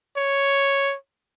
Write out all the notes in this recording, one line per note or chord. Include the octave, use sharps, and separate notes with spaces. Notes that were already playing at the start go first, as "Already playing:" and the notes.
C#5